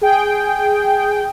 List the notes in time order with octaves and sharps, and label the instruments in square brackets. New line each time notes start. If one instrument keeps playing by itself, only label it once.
[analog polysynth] G#4 G5